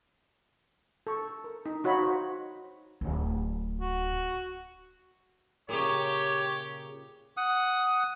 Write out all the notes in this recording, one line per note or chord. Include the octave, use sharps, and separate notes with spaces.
A4 C#6
A#4
D#4
D#4 F#4 C#5 F5 B5
C5
D1
F#4
A#2 C#3 G4 C#5
F#5 D#6